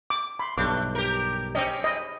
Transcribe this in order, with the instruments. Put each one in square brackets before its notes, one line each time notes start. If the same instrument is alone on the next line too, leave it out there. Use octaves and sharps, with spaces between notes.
[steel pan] D6
[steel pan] B5 [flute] C6
[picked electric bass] B1 G2 [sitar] A3 [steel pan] D6 [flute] F#6
[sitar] G4 A#4 [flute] G6
[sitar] C4 C#4 [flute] G4 [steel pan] D#5
[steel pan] D#5 [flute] B5